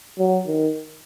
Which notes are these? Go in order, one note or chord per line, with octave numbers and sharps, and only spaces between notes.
F#3
D#3